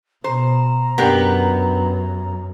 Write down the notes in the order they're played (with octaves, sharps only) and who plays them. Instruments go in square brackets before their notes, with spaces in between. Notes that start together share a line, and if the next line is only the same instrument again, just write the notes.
[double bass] B2 [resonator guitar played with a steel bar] C5 [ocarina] A#5
[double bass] F#2 [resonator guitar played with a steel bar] B3 [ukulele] D4 G4 A#4